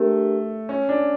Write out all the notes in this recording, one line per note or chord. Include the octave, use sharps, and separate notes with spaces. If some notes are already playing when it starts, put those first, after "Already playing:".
Already playing: A3 D4 G4 A#4
C#4
D4